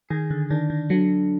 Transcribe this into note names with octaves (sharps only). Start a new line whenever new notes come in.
D#3 G#4
D3
D#3 D4
D#3
D3 F#3